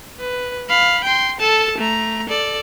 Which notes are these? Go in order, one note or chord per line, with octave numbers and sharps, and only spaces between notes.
B4
F5 B5
G5 C6
A4 A5
A3 A#5
A4 D5